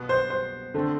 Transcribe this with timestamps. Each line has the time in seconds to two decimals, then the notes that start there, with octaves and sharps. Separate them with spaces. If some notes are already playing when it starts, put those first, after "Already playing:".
Already playing: B2 B3
0.09 C5
0.30 C5
0.74 D3 A3 C4